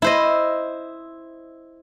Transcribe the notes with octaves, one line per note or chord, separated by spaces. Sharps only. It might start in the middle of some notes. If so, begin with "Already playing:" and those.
E4 C5 D#5